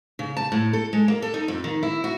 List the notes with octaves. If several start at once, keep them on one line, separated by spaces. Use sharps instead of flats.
C#3
A5
A2
A4
G#3
A#3
A4
D#4
F2
D#3
E4
F#4